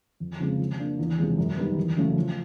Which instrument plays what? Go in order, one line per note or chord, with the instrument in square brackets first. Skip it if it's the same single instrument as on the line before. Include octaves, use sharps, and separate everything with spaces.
[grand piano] F2
C#3 F3 G#3 C4
F3
A#3 D4
E2
C3 F3 G#3
F#2
D#3 G3 B3
E2
C#3 F#3 A3 C#4
F3